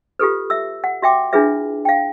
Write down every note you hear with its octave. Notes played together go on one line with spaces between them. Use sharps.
F4 G4 A4 B4
E5 E6
F#5
F#4 E5 G5 D6
D4 E4 F4 G#4 B4 E5
F5 G5